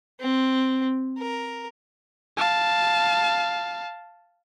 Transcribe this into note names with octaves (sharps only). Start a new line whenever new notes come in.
C4
A#4
F5 A5